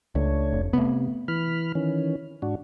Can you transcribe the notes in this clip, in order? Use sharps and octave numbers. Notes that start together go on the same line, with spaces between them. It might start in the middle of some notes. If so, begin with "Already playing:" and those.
C#2 A3 D4 C#5
F1
C3 A3 B3
E3 B5 F6
D#3 E3 C#4
G#2 D4 F#4